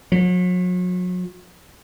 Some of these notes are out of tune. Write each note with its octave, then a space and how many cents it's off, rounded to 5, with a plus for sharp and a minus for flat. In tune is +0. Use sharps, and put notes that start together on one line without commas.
F#3 -40